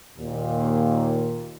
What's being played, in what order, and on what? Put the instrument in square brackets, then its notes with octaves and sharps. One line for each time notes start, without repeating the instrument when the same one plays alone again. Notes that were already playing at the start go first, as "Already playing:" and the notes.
[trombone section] D#2 A#2